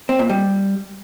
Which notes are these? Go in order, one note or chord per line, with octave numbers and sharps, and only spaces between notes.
C4
A#2
G3